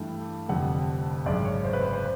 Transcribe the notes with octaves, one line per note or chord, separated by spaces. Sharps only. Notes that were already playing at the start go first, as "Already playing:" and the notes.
Already playing: G2 E3 A3 D4 G5
F1 F2 D3 G3 F#5
G#1 F#2 C#3 D5
C#5
C5
B4
C5
C5